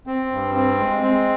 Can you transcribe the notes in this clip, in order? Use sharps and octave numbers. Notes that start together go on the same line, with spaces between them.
C4
G2
C4
G#3
C4